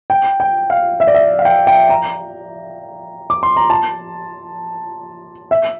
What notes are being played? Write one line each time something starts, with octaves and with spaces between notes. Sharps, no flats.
G5
G5
F5
E5
D5
E5
F5
G5
G5
A#5
D6
C6
A#5
A5
E5